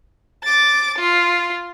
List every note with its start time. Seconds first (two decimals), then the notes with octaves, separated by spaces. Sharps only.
0.44 D6 A6
0.98 F4